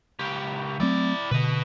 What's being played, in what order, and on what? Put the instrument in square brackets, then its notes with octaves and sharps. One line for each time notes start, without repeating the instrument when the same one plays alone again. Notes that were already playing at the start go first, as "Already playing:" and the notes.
[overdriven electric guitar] C#2 G4
[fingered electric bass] F#3 A3 C4 [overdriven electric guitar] E4 D5
[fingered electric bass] B2 D3 [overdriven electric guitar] B4 D#5